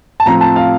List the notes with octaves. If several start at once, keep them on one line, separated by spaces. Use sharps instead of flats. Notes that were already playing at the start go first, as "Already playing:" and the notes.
A5
A2 F3 C4 A#5
A5
F5